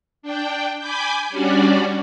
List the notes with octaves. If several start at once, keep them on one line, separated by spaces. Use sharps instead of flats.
D4 G5
G#5 B5 D6 G6
G3 C#4 D4 F#4 D5